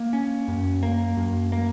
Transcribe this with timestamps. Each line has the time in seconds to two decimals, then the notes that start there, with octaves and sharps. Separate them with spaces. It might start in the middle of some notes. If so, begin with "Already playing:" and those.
Already playing: A#3
0.13 C#4
0.48 F#2
0.83 A#3
1.17 F#2
1.52 A#3